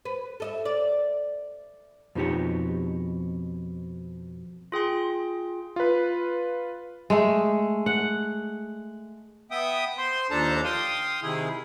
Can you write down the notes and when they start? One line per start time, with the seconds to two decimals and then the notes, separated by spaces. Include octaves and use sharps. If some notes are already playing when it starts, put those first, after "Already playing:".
0.05 B4
0.40 A4 D#5 E5
0.65 D5
2.15 F2 B2 D#4 G4 C#5
4.72 F4 G#4 G5 C6
5.76 F4 B4
7.10 G#3 A3
7.86 F#5
9.51 B3 E5 G5 D#6
9.98 C5 C6
10.31 D#2 F3 D4 A4 A5 A#5
10.64 F5 G5 C6 D#6
11.22 C3 D#3 E4 G#4